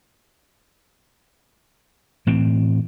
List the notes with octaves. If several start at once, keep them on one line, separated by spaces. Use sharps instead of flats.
A2 E3 C4